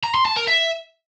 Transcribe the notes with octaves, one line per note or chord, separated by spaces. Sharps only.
A#5
C6
A5
A#4
E5